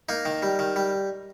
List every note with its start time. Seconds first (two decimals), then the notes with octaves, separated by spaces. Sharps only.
0.09 A#3 D#4
0.25 D#3
0.42 G3
0.59 D#3
0.76 G3